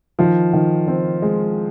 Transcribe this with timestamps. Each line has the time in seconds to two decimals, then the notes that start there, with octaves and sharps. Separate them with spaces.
0.19 D#3 F3
0.53 D#3
0.88 C4
1.22 G#3